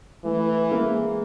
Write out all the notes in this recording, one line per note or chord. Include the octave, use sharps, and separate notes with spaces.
E3 A3
G#3 A#3